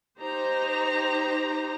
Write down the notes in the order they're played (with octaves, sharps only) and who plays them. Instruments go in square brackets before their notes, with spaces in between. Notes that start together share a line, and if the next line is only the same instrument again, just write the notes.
[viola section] D#4 G4 C5 A#5